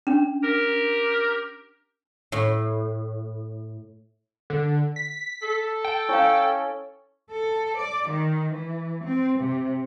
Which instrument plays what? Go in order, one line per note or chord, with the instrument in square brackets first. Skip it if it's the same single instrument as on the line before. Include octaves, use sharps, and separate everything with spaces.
[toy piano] C#4 D4
[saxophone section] G4 A#4
[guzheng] A2
[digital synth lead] D3
B6
[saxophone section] A4
[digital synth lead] G5
[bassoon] C#4 [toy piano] E4 C#5 F5
[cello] A4
D5
D#3
E3
C4
C3